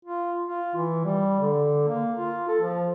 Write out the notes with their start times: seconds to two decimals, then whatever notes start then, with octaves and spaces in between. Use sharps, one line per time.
0.05 F4
0.47 F4
0.75 E3
1.05 G3
1.40 D3
1.87 A#3
2.17 F4
2.48 A4
2.61 F3